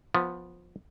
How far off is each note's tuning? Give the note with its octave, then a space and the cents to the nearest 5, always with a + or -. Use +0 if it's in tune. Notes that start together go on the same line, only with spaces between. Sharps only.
F3 +15 B3 +0